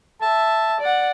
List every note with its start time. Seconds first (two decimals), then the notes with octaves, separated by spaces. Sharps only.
0.22 E5 A5
0.81 D5 F#5